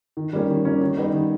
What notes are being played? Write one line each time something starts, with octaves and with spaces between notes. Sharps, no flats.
D#3
G3 A#3 C#4
D#3
G3 A#3 C#4
D#3
G3 B3 D#4
D#3